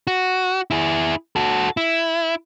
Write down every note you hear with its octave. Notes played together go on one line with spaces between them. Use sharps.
F#4
E4 G#4
F#4 A4
E4